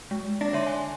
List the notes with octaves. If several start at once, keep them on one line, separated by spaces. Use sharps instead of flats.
G#3
D4 A#6
D3 C#5 E5 C6
G#5